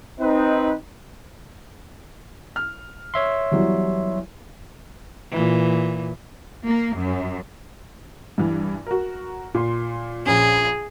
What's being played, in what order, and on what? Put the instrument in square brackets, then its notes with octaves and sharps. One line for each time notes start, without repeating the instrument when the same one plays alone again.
[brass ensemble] C4 D#4 B4
[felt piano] F6
[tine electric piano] C#5 E5 C6
[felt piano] E2 F#3 G3
[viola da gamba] A#2 E3
[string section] A#3
F#2
[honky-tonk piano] G2 E3
F#4 A#4
A#2 C6
[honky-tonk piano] A#1 C#4 [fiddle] G#4